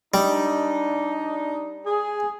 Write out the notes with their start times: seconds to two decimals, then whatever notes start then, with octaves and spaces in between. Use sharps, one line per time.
0.14 G3 D4 D#4
1.85 G#4